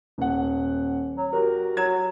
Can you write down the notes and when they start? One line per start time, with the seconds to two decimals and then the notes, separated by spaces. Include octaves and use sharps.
0.18 D#1 F#5
1.17 F#3
1.33 F#4 G4 A#4
1.77 F#3 F#4 G#6 E7